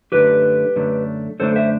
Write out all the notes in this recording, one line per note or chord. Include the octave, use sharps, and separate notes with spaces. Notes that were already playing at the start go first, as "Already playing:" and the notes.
F#2 D3 A3 D4 G4 B4
F#2 D3 A3 D4
F#2 D3 A3 D4 A4 C5
C5 E5